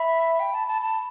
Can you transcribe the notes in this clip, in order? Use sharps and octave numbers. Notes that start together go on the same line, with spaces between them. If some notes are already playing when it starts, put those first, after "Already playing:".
Already playing: E5 B5
G5
A5
A5
A5